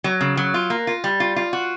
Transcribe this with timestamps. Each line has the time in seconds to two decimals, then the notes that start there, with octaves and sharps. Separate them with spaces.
0.04 F#3
0.21 C#3
0.37 F#3
0.54 F4
0.70 A#3
0.87 F4
1.04 G3
1.20 F4
1.36 F4
1.53 F#4